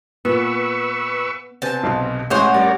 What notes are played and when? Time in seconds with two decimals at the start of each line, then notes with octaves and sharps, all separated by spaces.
0.25 A#2 B3 B4 C#6 E6
1.62 C3 B3 C5 G#5 A5
1.83 B1 B2 C6
2.30 A1 G#3 G#4 C5 C#5 F#5 C6
2.54 G3 C#4 A#4 D5